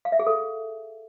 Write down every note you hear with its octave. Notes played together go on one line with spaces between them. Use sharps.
F5
E5
G#4
A4